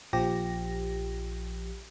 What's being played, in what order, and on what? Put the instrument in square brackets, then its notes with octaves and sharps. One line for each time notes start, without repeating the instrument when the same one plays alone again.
[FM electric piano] A#1 F3 G4 A#6